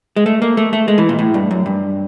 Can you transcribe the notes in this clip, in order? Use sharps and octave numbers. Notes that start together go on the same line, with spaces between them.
G#3
A3
A#3
A3
A3
G#3
E3
A#2
A2
G2
F#2
G2